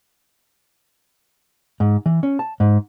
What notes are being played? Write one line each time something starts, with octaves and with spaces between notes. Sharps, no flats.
G#2
E3
C#4
A5
G#2